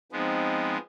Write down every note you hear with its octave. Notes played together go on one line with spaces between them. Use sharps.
F3 G#3 B3 C4 D#4